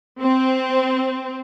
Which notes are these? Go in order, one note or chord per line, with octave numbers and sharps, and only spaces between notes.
C4